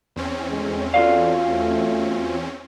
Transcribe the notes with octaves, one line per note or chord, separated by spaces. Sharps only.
E2 C4 C#4
D2 A2 G#3
F4 F#4 A4 D5 F5
A3